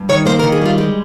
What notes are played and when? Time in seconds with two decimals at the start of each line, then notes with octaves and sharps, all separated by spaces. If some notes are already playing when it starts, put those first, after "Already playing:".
Already playing: G2
0.09 D#3 C#5
0.26 A#3 C5
0.39 A#4
0.44 D#3
0.52 G#4
0.62 G3 F4
0.78 G#3 G4